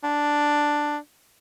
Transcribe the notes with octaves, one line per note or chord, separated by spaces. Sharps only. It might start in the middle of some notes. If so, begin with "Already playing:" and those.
D4